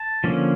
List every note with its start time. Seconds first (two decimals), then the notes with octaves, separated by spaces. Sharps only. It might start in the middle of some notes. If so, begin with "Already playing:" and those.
Already playing: A5
0.24 D3 F3 A#3 C#4